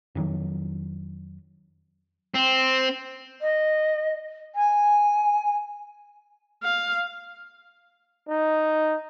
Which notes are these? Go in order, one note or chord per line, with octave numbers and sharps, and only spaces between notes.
F2 D#3 F#3
C4
D#5
G#5
F5
D#4